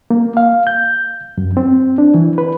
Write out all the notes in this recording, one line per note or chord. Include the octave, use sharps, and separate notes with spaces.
A#3
F5
G6
F#2
C4
D4
E3
B4